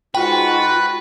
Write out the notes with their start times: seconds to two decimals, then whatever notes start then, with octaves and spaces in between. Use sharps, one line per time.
0.15 G#2 F4 F#4 B4 G5